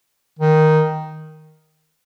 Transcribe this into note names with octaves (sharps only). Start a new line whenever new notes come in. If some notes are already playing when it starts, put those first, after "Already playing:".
D#3